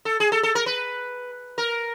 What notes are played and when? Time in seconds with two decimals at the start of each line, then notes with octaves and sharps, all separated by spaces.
0.05 A4
0.20 G#4
0.32 A4
0.43 A4
0.55 A#4
0.66 B4
1.58 A#4